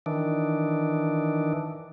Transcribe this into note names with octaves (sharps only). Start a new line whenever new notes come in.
D#3 E3 D4